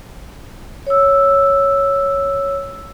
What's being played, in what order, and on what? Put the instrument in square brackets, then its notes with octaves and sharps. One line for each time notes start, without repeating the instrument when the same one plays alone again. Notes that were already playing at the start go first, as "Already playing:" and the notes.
[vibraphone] C#5 E6